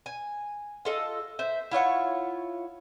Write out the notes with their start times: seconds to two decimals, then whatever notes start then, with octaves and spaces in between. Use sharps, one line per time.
0.06 G#5
0.85 F4 A4 D#5
1.39 C5 E5
1.71 E4 F4 C#5 F#5